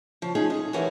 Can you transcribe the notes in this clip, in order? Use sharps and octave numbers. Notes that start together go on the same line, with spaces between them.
C#3 F3
C#4 D#4 F4 G#4
D#5
E3 G4 A#4 C#5 F#5 G#5